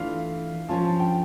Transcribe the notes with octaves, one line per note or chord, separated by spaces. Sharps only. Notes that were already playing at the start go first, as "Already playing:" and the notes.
Already playing: E3 A3 D4 F4 F5
F3 C#4 F4 A5
A5
G5